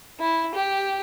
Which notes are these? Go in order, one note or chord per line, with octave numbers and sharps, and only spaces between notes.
E4
G4